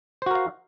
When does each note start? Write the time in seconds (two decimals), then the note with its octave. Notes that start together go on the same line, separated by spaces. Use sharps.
0.22 C5
0.26 F#4
0.31 A#4
0.35 F5